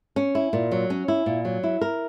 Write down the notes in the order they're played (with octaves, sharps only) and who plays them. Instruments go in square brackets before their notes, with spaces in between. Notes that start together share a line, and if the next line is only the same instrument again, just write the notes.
[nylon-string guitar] C#4
E4
A#2
F#3
C#4
E4
A#2
F#3
E4
A#4